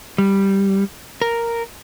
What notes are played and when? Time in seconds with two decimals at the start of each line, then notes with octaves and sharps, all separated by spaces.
0.18 G3
1.22 A#4